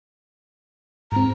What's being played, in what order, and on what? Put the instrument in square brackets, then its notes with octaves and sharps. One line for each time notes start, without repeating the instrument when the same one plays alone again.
[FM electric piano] G#2 C4 [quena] A#5